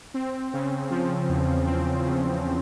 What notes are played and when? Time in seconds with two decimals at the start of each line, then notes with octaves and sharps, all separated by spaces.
0.14 C4
0.53 C#3
0.90 F3
1.29 E2
1.67 C4
2.05 C#3
2.42 F3